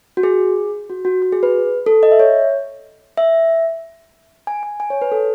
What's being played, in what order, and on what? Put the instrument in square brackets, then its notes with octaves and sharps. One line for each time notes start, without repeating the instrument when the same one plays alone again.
[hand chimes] F#4
G#4
F#4
F#4
F#4
G#4
B4
A4
D#5
E5
C#5
E5
G#5
G#5
G#5
C#5
B4
A4